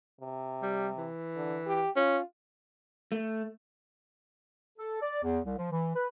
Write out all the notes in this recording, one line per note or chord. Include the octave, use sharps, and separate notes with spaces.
C3
G3
E3
D3
G4
C#4 F4
A3
A4
D5
E2
C2
F3
E3
B4